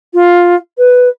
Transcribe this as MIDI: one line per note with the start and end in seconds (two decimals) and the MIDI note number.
0.14 0.55 65
0.78 1.09 71